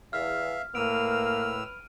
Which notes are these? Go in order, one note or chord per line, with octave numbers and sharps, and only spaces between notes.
E2 E5 F5 F6
A2 A#3 B4 B5 E6 F6 D7 D#7